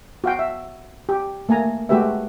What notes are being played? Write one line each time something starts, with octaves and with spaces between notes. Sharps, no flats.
F#4 F5 G5
E5
G4
A3 A#3 G#5 A#5
G#3 A3 F#4 G4 B4 E5